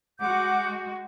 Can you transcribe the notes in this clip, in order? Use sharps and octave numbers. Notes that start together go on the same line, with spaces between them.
G#3 F#4 F#5 D6 G6